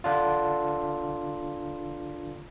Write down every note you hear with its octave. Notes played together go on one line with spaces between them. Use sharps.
D3 D4 F4